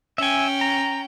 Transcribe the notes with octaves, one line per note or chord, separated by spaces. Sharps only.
C#4 E5 G5 G#5
A#5